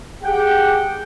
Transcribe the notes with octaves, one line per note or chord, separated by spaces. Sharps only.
G4 G#4 F#5 G5